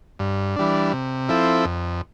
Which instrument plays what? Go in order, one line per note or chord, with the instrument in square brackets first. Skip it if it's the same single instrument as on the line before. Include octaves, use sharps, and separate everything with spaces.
[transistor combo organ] G2
E3 G3 D4
C3
F3 C4 E4 A4
F2